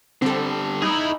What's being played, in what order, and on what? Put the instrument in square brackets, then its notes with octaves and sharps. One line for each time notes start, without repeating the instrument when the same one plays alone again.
[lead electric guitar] D3 G3 [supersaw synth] C4 A4
[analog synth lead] D#4 [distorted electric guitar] E4 G#4